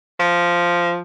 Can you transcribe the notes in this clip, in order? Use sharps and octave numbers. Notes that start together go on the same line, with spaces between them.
F3